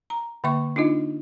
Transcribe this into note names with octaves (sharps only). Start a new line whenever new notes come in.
A#5
D3 A#3 E5 C#6
D4 D#4 F4 D#5